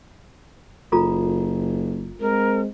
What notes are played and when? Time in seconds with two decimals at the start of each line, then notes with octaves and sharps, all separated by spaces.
0.92 F#1 F4 A4 A#5
2.21 G#3 C4 A#4